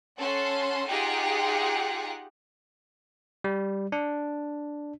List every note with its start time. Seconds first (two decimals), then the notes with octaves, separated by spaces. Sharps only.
0.19 C#4 A4 F#5 C6
0.88 D#4 F4 G4 G#4 F#5 G5
3.44 G3
3.92 D4